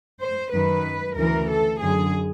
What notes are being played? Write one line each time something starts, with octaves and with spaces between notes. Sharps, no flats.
C5
F#2 D#3 B4
D2 C#3 E3 A#4
A4
F#2 D3 G#4